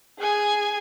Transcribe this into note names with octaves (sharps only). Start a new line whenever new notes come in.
G#4 G#5